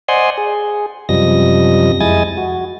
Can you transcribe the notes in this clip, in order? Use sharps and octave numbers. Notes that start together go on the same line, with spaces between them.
C5 D5 D#5 F#5 G#5 C6
G#4
F#2 C3 F3 G3 D#5 A#6
F2 G#3 E4 D#5 G#5 A6
F#4